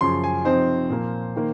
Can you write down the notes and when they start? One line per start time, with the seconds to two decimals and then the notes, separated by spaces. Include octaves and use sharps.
0.01 F#2 C#3 F3 C6
0.24 G#5
0.45 C3 F3 C4 D#4 C5
0.89 A#2 F3 A#3
1.36 D#3 A#3